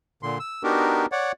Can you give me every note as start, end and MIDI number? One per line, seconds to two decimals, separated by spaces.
0.23 0.38 46
0.23 0.38 50
0.23 0.38 84
0.40 0.63 88
0.63 1.06 59
0.63 1.06 62
0.63 1.06 63
0.63 1.06 66
0.63 1.06 67
0.63 1.06 70
1.12 1.32 73
1.12 1.32 74
1.12 1.32 78